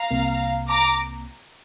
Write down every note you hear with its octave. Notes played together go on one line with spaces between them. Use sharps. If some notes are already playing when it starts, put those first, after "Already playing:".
Already playing: F5 A#5
C2 C3 A#3
A#5 D6